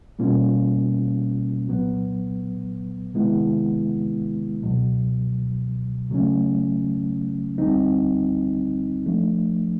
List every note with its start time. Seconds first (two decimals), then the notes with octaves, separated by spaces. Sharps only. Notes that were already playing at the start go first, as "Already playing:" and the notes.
0.19 B2 G3 A#3 C#4 F4
1.66 C2 A#2 F#3 B3
3.14 C3 D#3 G#3 B3 E4
4.63 C#2 B2 F#3
6.10 C#3 F#3 A3 C#4
7.58 D2 D3 G3 C4 D#4
9.06 F3 A3 D4